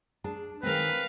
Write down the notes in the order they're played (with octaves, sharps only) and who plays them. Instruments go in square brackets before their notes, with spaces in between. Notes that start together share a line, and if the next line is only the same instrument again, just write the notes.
[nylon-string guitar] D4 G#4 A5
[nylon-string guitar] D#3 G#3 C4 [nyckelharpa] A#4 F5 [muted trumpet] B4